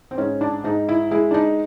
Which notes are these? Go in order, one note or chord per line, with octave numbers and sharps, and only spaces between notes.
C4
G#2 C#4
D4
G#2 D#4
E4
G#3 E4
D4
D#4